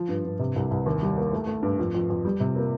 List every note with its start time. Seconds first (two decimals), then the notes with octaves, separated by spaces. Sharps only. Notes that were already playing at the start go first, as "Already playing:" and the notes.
Already playing: F3
0.09 G2
0.25 G2
0.39 C3
0.56 C2
0.71 C2
0.86 D#2
1.02 G3
1.18 A#3
1.33 A3
1.47 A3
1.63 G2
1.79 F2
1.95 F2
2.10 F2
2.25 G3
2.40 C3
2.56 A#3